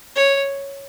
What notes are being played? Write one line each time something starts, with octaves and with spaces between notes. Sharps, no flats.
C#5